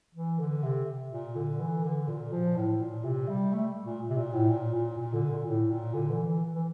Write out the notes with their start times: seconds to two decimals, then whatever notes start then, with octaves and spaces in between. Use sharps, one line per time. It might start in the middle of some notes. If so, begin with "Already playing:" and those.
0.15 E3
0.39 D3
0.63 C3
1.11 A#2
1.36 D3
1.60 E3
1.84 D3
2.08 A#2
2.32 F3
2.56 A2
2.80 A#2
3.04 C3
3.29 G3
3.53 A3
3.85 A#2
4.10 C3
4.17 A#2
4.33 A2
4.49 A#2
4.74 A#2
4.98 A#2
5.13 D3
5.30 A#2
5.46 A2
5.70 A#2
5.94 D3
6.10 E3
6.26 E3
6.55 E3